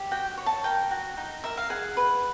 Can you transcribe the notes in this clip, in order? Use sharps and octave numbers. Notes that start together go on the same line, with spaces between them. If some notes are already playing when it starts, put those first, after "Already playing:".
Already playing: G4
F#4 G5
C#5
A5
A#4 G5
F#4
D#4
A#4 E5
F5
G#4 F#5
B4